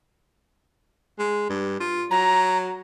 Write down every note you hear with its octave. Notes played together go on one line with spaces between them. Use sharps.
G#3
G2
F4
F#3 A#5